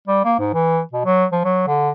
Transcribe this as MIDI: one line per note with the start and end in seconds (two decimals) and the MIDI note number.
0.08 0.22 55
0.25 0.36 58
0.39 0.53 44
0.54 0.80 52
0.93 1.04 47
1.05 1.25 54
1.32 1.41 53
1.44 1.67 54
1.68 1.90 50